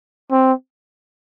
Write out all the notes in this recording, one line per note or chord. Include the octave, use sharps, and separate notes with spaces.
C4